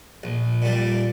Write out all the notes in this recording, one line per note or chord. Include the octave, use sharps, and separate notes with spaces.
A#1
A#2 G3